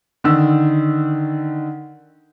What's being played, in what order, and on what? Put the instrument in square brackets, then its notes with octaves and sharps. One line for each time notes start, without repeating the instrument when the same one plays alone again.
[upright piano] D3 D#3 E6